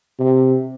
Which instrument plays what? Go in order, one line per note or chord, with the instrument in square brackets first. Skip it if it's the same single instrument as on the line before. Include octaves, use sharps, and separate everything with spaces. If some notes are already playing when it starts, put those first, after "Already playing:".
[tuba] C3